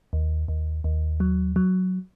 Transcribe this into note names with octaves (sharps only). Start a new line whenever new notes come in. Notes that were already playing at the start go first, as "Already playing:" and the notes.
D#2
D#2
D#2
F#3
F#3